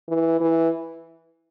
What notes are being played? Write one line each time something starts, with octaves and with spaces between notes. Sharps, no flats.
E3
E3